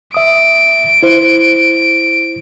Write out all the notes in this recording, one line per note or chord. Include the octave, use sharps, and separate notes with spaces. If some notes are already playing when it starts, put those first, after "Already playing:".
E5 D#6 D7
E4 C5